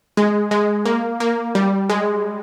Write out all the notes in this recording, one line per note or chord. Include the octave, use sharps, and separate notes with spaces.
G#3
G#3
A#3
A#3
G3
G#3